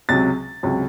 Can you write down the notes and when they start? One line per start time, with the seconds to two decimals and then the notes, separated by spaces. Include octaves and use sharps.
0.09 C#2 C3 F#3 A6
0.63 C#2 C3 F#3